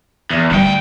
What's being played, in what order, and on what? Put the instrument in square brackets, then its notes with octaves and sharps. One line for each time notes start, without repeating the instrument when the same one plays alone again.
[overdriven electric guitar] E2
[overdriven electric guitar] D2 G5 [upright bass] G3